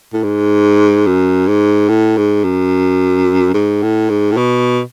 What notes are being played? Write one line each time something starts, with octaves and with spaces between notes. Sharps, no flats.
A2
G#2
F#2
G#2
A2
G#2
F#2
G#2
A2
G#2
A2
B2